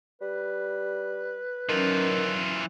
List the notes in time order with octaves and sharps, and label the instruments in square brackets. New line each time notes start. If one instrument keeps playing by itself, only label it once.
[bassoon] G3 [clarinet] B4
[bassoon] D#3 [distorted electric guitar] E3 F4 [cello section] F#3 C#4